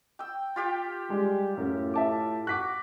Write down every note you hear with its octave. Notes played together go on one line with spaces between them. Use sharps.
G5 E6
F4 G4 G5
G3 G#3
F#2 A2
E5 A5 D6
F#4 D6 F#6 B6